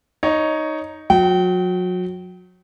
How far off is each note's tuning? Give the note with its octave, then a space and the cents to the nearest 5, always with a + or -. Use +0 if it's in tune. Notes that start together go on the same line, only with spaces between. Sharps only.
D#4 +0 C#5 +5
F#3 -30 G5 -30